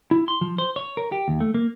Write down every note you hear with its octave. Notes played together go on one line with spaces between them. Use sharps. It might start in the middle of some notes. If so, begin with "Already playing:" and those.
E4
C6
F3
C5
C#5
A#4
G4
D#2
A3
A#3